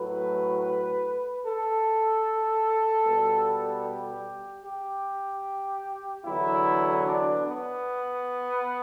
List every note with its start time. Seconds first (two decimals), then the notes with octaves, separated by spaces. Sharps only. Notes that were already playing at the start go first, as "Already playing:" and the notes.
Already playing: A2 F#3 A3 B4
1.43 A4
3.04 B2 G3 B3
3.84 G4
4.64 G4
6.25 E2 D3 F#3 B3 E4
7.05 D4
7.45 B3